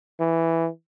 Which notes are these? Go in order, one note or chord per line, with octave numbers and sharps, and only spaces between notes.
E3